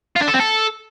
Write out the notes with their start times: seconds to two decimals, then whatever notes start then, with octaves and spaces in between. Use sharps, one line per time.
0.16 F4
0.22 D4
0.28 A4
0.34 C4
0.40 A4